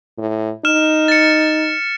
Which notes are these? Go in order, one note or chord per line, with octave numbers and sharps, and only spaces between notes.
A2
D#4 F6 E7
A6 C#7